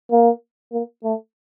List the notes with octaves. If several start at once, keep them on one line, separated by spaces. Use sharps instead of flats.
A#3
A#3
A3